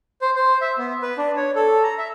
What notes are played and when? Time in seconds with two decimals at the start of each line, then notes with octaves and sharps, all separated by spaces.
0.21 C5
0.36 C5
0.61 E5
0.78 B3
1.02 B4
1.18 D4
1.36 C#5
1.55 A4
1.84 A#5
1.98 E5